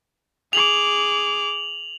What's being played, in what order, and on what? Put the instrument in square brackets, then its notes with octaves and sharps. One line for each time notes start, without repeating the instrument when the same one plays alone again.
[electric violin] G#4 D6 [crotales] F7 F#7